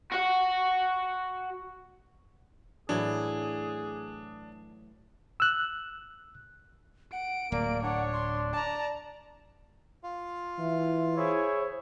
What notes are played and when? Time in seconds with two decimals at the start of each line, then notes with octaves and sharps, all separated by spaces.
0.12 F#4 F#5
2.89 A2 E3 F#3 D4 G#4
5.40 E6 F#6
7.13 F#5 D7
7.52 D1 A#3 D5
7.83 D4 C#5 F#5
8.13 C6
8.53 D5 A5 A#5
10.03 F4 F5
10.59 E3 E5
11.17 E4 G#4 C5 C#5